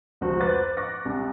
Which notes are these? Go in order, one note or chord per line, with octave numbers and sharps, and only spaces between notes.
F1 C#2 F3 F#4 C5
B4 C5 A#5 D6 F#6 A6
C#6 D6 F#6 A#6
C2